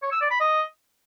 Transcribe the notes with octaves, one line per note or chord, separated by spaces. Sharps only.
C#5
E6
D5
B5
D#5